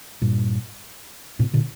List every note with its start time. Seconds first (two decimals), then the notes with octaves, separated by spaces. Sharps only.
0.22 G2 A#2
1.39 A2 C3
1.54 A#2 D3